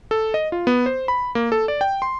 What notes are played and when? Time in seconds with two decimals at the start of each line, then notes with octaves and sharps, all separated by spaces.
0.11 A4
0.34 D#5
0.52 F4
0.67 B3
0.86 C5
1.08 B5
1.35 A#3
1.52 A4
1.68 D5
1.81 G5
2.02 C6